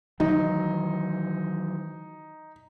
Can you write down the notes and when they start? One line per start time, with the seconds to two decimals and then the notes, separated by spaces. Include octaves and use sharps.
0.20 D#3 E3 F#3 D#4